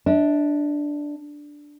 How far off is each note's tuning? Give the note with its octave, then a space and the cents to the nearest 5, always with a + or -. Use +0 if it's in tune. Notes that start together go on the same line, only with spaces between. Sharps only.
D4 +0 E5 -45